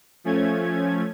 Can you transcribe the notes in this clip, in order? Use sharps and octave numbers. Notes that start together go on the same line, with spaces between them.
F3 A3 C#4 G#6